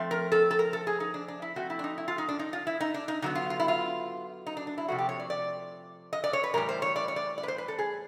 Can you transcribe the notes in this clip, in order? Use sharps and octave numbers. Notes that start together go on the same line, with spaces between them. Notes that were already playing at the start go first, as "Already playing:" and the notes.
Already playing: F3 A3 C4
A#4
A4
A4
A#4
A4
G#4
D#4
D4
D4
E4
F3 A3 C4 F#4
E4
D4
D#4
E4
F4
D#4
D4
D#4
F4
E4
D#4
D4
D#4
D3 F#3 B3 D#4
F4
F4
E4
F4
D#4
D4
D4
E4
C3 F3 A3 F#4
G4
C#5
D5
D5
D#5
D5
C#5
B4
A2 E3 G3 A#4
C5
C#5
D5
C#5
D5
D5
B4
C5
B4
A4
G#4